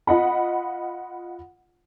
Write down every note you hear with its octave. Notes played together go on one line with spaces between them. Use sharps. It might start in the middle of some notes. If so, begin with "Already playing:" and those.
F4 D#5 F#5 B5